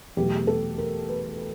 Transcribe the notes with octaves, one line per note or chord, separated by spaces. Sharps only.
E2 B2 F#3 A3 G4
A4
A#4
B4